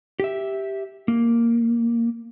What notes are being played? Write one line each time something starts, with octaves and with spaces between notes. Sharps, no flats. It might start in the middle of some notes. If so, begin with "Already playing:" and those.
G4 E5
A#3